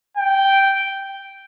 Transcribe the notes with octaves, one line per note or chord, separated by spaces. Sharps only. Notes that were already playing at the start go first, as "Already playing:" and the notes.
G5